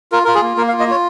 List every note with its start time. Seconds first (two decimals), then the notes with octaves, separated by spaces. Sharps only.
0.12 F4 A#4
0.25 F4 A#4
0.35 G#4
0.42 A#3
0.57 A#3 A#4
0.68 F5
0.72 F4
0.80 D#5
0.87 F4 C#5